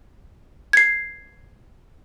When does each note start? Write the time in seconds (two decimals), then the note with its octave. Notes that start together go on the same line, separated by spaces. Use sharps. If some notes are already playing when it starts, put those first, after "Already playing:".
0.73 G#6 C7